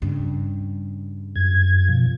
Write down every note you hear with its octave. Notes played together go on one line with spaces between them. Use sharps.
G2 C#3
F#2 G#6
B2 F3